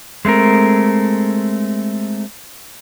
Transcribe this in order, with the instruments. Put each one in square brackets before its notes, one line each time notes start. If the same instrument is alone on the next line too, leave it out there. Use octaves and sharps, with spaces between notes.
[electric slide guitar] G#3 A3 C4 A#4